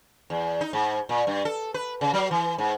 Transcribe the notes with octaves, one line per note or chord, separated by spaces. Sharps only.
E2
D#4
G#2
A#2
G2
A4
B4
C#3
F#3
E3
G#2